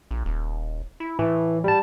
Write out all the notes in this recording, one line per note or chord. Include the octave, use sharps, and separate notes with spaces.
A#1
D#1
E4
A2 E3
G3 A5